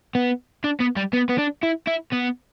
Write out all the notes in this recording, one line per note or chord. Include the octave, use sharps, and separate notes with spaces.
B3
D4
B3
G3
B3
B3
D4
E4
E4
B3